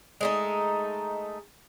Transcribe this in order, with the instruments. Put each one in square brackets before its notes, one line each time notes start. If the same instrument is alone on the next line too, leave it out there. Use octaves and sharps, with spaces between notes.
[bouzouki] G#3 A3 D#4